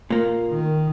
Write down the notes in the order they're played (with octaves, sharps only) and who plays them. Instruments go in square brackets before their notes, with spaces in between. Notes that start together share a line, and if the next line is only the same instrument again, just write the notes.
[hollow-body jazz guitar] A#2 A#3
[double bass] D#3